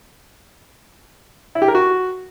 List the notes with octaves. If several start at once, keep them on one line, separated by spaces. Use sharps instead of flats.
E4
G4
A#4
F#4